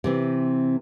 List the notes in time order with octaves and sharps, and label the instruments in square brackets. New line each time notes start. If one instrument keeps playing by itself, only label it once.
[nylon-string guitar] C3 E3 C4